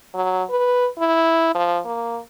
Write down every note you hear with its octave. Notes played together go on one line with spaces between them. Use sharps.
F#3
B4
E4
F3
A#3